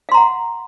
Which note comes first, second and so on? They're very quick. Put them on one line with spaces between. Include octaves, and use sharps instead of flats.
F5 C6 A#5 F#5